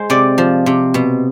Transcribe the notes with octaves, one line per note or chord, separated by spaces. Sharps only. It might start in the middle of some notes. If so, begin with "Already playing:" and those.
Already playing: G#3 C5
C3 D5
F3
C3
B2